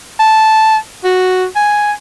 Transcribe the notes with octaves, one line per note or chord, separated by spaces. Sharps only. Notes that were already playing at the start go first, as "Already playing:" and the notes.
A5
F#4
G#5